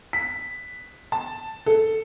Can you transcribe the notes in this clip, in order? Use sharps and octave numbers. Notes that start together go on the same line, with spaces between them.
B6
A5
A4